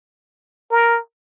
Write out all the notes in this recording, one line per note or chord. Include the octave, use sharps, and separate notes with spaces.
A#4